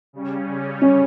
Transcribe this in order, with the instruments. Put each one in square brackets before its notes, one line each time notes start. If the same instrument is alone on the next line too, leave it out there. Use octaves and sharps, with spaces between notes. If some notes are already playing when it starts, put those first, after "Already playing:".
[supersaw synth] C#3 G3 C#4
[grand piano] C#4